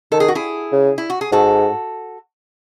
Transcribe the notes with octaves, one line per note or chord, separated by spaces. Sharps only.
D#3 A4
G#4
F#4
E4 G#4
C#3
E4
F#4
G#4
G#2 F#4 A4